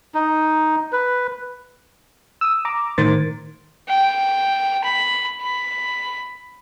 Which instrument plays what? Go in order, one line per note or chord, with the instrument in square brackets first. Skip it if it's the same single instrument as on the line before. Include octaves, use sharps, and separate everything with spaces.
[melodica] D#4
B4
[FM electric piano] D#6 E6
A#5 D6
A2 D#3 A#4 C5 A6
[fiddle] G5
B5
B5